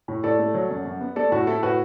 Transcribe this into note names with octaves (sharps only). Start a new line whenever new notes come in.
A2
A2 A4 D5
A3
F#3
F#2
F#2
B3
A3 A4 D5
A2 F#4
A3 E4 A4
A2 F#4 B4